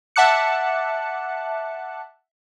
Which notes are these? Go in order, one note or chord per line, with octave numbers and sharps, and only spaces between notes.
E5 F#5 A5 D6 F#6 C#7